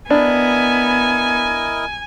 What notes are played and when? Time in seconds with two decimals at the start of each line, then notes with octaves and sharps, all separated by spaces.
0.10 B3 D4 E4 A#4 D#5 G#5